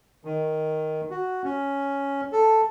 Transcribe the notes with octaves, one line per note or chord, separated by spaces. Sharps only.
D#3
F#4
C#4
A4